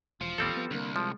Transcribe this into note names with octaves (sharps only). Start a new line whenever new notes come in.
E1 F3 F4
A1 D#2 G3 C4 A4
B3
C2 D3 A#3
F3 G#3